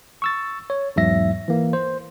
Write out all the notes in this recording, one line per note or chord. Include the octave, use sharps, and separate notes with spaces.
C#6 E6 A6
C#5
E2 G#2 F#3 E5 A#6
E3 A#3
C5